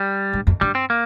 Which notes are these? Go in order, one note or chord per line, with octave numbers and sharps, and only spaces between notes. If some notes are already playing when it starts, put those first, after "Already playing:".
Already playing: G3
G2
F2
G2 G3
C4
A#3